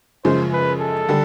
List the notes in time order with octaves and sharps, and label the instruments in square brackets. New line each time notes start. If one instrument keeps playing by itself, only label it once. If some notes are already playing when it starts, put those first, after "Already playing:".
[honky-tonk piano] F#2 C#3 F3 G#3 [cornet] C5
[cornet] B4
A4
[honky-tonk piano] D3 G3